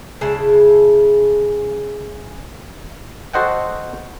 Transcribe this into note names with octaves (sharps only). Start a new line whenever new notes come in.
C#3 G#3 E4 A5
F#4 A4 C5 D#5 F#5 G5